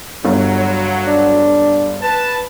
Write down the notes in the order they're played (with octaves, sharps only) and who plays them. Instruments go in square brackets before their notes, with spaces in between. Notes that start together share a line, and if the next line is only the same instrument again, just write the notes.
[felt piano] G1 [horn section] F#3
[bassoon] D4
[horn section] B4 A5